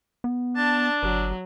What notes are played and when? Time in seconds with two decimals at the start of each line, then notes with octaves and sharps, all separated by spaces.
0.24 B3
0.56 D4 A5
1.03 G1 F#3